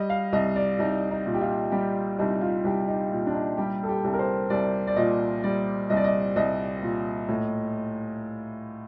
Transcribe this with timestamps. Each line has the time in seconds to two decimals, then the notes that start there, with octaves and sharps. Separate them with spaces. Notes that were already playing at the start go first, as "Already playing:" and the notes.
Already playing: G3 D#5
0.10 F5
0.33 C2 D#5
0.56 D5
0.79 C2 D#4
1.11 D#4
1.26 A#2
1.34 G4
1.41 F4
1.72 G3 G4
2.19 C2 D#4
2.41 F4
2.64 C2 G4
2.88 D#4
3.12 A#2
3.27 D4
3.35 D#4
3.57 G3 G4
3.83 A4
3.89 G4
4.04 C2
4.13 A#4
4.19 C5
4.50 C2 D5
4.87 D5
4.96 A#2 D#5
5.44 G3 D5
5.90 C2 D#5
5.97 D5
6.04 D#5
6.36 C2 D#5
6.82 A#2
7.28 A2